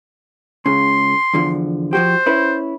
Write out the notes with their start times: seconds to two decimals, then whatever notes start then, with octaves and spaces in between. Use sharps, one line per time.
0.66 C#2 C#3 C6
1.34 E2 D3 F3
1.93 F3 F#4 G4 C5
2.26 C#4 E4 B4